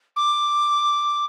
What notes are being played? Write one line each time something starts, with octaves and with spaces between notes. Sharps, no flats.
D6